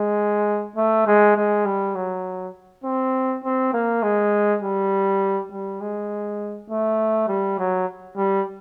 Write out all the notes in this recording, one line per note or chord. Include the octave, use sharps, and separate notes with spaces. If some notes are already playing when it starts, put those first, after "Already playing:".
Already playing: G#3
A3
G#3
G#3
G3
F#3
C4
C4
A#3
G#3
G3
G3
G#3
A3
G3
F#3
G3